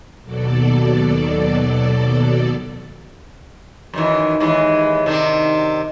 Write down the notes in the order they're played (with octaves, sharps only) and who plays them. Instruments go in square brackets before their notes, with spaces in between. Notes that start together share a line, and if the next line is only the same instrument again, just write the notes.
[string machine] D#2 B2 F#3 A4 D5
[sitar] F#2 D#3 E3
D#2 E3 G#3
C3 D#3 D4